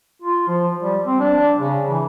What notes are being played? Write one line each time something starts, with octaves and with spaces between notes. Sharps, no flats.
F4
F3
G3
C4
D4
C#3
E3